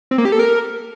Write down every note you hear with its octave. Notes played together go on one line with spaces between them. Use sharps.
C4
A#3
G4
A4
A#4